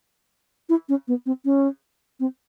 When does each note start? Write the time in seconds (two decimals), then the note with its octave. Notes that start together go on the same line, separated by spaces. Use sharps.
0.69 E4
0.89 C#4
1.08 B3
1.26 C4
1.45 C#4
2.20 C4